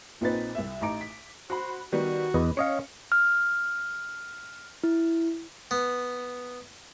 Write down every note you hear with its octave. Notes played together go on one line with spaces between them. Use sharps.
A#1 A#2 C4 D#4 B4 A6
C2 E5
A1 D#4 A#5 D6 D7
B6
F#4 C5 B5
D#3 G3 B3 F#4
E2 B4 D#5
C#4 C#5 D#5 F5 C#7
F6
E4
B3